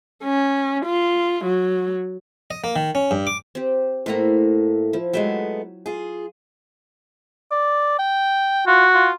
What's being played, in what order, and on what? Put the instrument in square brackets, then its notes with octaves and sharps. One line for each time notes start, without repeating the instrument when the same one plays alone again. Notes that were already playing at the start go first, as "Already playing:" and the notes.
[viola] C#4
F4
F#3
[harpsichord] D#5
A#3
D#3
C#4
G2
D6
[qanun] C4 G4
[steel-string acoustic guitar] A2 A3 A#3 [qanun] C5 A#5
[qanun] F3 E4
[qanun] F#3 E5 G5 [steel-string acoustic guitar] G#3 A3 B3
[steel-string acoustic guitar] F4 G#4
[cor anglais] D5
G5
[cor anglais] F4 [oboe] F#4
[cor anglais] F4